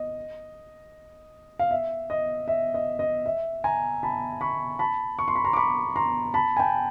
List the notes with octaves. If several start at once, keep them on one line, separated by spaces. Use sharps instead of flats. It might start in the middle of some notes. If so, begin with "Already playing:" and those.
Already playing: D#5
F5
E5
D#5
E5
D#5
D#5
E5
G#5 A#5
A5 B5
B5 C#6
A5 B5
C#6
C6
B5
A#5 C6
D6
B5 C#6
A#5 C6
A5 B5
G#5
G5 A5